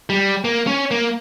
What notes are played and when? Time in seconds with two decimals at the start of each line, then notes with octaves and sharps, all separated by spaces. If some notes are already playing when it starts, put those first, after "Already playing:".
0.10 G3
0.45 A#3
0.67 C#4
0.91 A#3